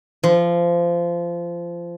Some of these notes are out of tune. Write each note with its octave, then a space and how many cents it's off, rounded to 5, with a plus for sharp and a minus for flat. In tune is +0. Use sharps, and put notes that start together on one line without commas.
F3 -20